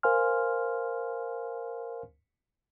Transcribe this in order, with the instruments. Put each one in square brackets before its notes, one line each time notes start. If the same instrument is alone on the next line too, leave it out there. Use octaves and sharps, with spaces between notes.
[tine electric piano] A#4 C5 F5 G#5 C6 F6